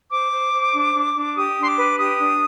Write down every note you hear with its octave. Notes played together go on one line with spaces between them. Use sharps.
C5 D6
C5
C5
D4
D4
D4
G4 D#6
D4
C6
D6
B4
G4 D#6
D4